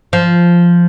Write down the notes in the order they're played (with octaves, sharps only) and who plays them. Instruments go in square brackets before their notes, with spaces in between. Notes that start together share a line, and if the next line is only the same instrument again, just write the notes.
[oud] F3